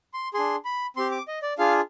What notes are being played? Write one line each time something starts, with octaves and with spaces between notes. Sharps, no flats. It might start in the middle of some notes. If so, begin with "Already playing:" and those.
C6
D4 G#4 C6
B5
C4 G4 C6
D6
D#5
D5
D4 F4 G#4 F5